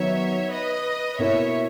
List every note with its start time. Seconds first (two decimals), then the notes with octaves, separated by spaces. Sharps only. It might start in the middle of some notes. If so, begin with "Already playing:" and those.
Already playing: D#3 F#3 B3 C#5 E5
0.52 B4 D#5
1.19 B2 A#3 E4 C#5 E5